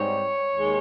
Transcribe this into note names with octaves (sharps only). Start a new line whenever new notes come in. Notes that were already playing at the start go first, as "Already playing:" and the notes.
Already playing: G#2 G3 C4 D#4 C#5
D#2 D#3 G#3